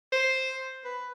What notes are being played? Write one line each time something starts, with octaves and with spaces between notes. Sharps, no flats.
C5
B4